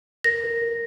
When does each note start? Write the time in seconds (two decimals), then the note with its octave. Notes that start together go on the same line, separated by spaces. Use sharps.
0.24 A#4 A#6
0.43 A#4
0.61 A#4